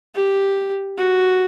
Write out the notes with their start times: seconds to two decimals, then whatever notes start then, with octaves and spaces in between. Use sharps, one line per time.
0.15 G4
0.98 F#4